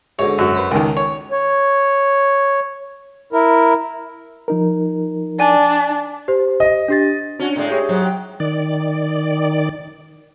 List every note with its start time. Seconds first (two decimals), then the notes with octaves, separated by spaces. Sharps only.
0.19 G#2 B2 D3 C#5
0.38 F#2 F#4
0.55 B4 C5 B5
0.71 C#2 D#3 A4 A#4
0.97 C#5
1.32 C#5
3.33 E4 A#4
4.48 F3 D#4 A#4
5.39 D4 D5 G#5
6.28 G4 C5
6.60 D#5
6.88 D4 G4 A6
7.40 C#4 D4 F#4
7.56 A2 G#3 D5
7.71 G4 G#4 C#5 E5
7.89 G#2 F#3
8.04 G5
8.40 D#3 D5